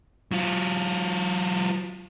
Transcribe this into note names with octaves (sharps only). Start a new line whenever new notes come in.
F#3 F4